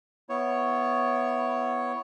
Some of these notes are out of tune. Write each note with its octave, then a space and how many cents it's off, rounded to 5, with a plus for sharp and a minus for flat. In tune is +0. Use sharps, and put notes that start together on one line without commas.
B3 +0 E4 +15 C#5 +0